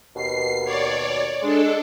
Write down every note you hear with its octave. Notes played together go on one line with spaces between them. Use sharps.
D#2 B2 C7
C#5 D5
G#3 D4 A4